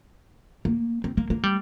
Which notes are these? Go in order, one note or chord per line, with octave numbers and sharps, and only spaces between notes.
A#3
C4
A#3
A#3
G3